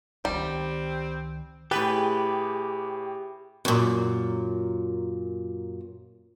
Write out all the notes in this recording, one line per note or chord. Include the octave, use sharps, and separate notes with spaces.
C#2 D#3 G3 C4
A2 G4 G#4 B4 G5 A6
F#2 A#2